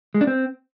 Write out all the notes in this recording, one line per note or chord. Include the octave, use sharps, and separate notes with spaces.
G#3
D4
C4